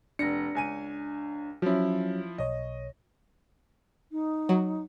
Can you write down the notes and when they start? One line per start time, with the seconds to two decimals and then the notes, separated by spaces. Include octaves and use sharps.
0.19 F1 D4 A#6 C#7
0.55 C#2 G#5 D#7
1.62 F3 F#3 C#4 E4
2.38 B1 C#5 D#5
4.11 D#4
4.49 F#3